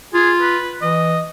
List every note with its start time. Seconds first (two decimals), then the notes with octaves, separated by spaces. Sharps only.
0.14 F4 G#4
0.41 B4
0.82 E3 D#5